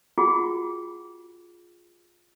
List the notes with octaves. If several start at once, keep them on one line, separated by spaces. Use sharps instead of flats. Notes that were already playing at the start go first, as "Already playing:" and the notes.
F4 F#4 G#4 F#5 G5